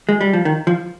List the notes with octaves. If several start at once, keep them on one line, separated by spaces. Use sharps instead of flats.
G#3
G3
F3
D#3
F3